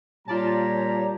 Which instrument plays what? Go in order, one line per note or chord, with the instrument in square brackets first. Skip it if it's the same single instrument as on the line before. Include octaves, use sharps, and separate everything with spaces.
[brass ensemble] A#2 A#5 [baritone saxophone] G3 [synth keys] F4 D5 A5 [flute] C#5